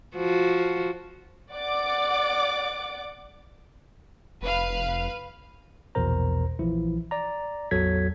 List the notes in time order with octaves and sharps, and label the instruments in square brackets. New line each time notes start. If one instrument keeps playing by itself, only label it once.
[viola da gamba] F3 F#4
[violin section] D5 F#5 D6
[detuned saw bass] F1 [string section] B4 F5
[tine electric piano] A#1 E2 B2 A#4 C5 A#5
A#1 E3 F3 E4
D5 A#5
A1 E2 F#3 A4 G#6 B6